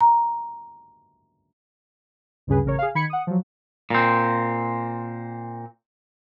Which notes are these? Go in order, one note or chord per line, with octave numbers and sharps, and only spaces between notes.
A#5
D2 G2 C#3 G#4 B4
A1 C#3 A#4 C#5
G#4 F5
D#3 B5 G#6 C#7
F#5 D#6
F3 F#3
A#2 C4